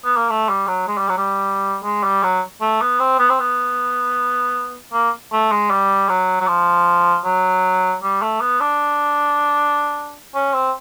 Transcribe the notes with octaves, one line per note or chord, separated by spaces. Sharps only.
B3
A#3
A3
G3
F#3
G#3
G3
F#3
G3
G#3
G3
F#3
A3
B3
C4
B3
C4
B3
A#3
A3
G#3
G3
F#3
F#3
F3
F#3
G3
A3
B3
D4
C#4
C4